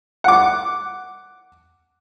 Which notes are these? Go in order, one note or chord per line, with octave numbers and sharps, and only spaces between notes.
F#5 D6